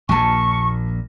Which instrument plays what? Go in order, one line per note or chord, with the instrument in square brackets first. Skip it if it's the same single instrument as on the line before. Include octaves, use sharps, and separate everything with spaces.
[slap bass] A#1 D#2 A#2 [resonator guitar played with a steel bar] G#5 A5 [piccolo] C#6